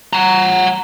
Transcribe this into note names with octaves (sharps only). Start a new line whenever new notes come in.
F#5 A#5